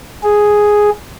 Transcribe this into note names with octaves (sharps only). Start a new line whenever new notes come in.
G#4